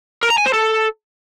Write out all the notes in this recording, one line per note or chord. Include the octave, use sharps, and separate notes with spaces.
A#4
A#5
G#5
C5
A4